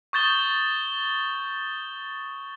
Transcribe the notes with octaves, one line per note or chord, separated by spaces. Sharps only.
C#6 D#6 G6 A6 E7 G7